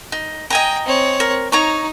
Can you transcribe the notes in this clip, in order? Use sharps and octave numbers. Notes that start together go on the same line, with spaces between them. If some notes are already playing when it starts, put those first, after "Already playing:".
D#4
D#5 G5 G#5 A#5
C4 C#5
A#4
D#4 C#5 A#5 C#6